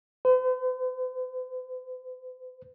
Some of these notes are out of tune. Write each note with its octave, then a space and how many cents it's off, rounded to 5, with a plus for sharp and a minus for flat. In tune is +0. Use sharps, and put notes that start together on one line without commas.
C5 -45